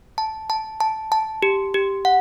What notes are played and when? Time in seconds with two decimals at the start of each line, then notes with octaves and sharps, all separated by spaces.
0.18 A5
0.50 A5
0.80 A5
1.12 A5
1.43 G4
1.74 G4
2.05 F#5